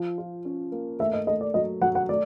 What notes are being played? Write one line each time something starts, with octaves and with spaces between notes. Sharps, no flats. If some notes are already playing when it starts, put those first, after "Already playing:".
Already playing: F3
F4
C#4
A#3
A3 E5
D#5
A3 D#5
D5
F#3 D#5
F#3 F#5
F#5
A3 D5